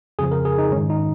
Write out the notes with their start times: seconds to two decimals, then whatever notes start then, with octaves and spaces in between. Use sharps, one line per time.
0.19 F2 C#3 F3 G#4
0.32 A#4
0.45 G#4
0.58 D#4
0.72 G#2 D#3 C#4
0.90 D#4